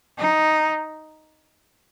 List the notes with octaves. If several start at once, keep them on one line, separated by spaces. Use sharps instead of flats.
D#4